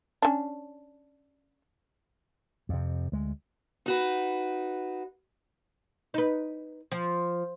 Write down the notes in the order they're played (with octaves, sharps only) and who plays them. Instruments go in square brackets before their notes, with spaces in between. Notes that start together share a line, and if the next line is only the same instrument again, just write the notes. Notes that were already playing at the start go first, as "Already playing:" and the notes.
[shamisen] C#4 D4
[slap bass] F2 C3
D2 G#3
[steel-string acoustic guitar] D#4 F#4 B4
[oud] D#4 B4
F3